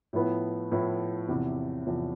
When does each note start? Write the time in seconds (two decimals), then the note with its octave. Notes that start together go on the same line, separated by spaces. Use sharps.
0.13 A2 F3 B3 E4
0.71 A2 F3 B3 E4
1.28 E2 C3 F3
1.87 E2 C3 F3